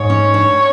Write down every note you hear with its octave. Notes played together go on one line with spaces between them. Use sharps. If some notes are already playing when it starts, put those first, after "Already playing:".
Already playing: G#2 C#5
C#4
D4